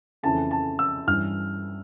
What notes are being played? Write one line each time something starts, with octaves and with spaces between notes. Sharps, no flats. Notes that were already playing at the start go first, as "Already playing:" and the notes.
F2 C#3 E3 A3 C#4 A5
A5
E6
G2 E3 G3 C#4 F6